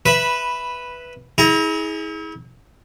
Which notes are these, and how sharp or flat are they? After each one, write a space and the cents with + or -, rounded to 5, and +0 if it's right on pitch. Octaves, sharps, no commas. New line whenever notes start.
B4 +0 E5 +0 B5 -10
E4 -40 G#4 +10 A#5 +0